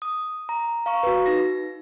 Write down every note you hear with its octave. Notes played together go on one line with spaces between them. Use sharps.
D#6
A#5
F5 A#5 C#6
F#4 B4
D#4 A#6